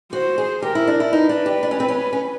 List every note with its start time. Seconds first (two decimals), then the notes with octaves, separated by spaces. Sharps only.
0.13 F#4 C5
0.38 G#4
0.62 G4 A#4
0.75 E4
0.87 D4
1.00 E4
1.12 D#4 B4
1.29 D4
1.46 G4
1.63 D4
1.71 C#4
1.80 C4
1.88 C#4
2.13 C#4